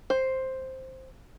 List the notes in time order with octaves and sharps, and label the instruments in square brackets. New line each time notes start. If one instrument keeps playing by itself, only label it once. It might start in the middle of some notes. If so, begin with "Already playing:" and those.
[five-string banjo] C5